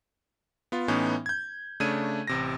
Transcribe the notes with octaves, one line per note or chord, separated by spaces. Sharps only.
B3 F4
A2 E3 B3 C#4 D#4
G6 G#6
C#3 A3 D4 C#5 G#6 D#7
A1 C3 A#6